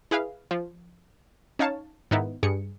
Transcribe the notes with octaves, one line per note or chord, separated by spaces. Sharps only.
E4 G#4 B4 F5
F3
C#4 D#4 C#5 F5 A5
G#2 D#3 B3 D#4 E4
G2 G#4 C#7